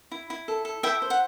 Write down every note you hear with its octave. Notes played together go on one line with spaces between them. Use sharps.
E4
E4
A4
A4
E4 E5 G5
C5
F#5